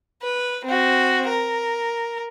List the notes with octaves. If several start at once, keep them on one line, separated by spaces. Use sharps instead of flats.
B4
C4 F#4
A#4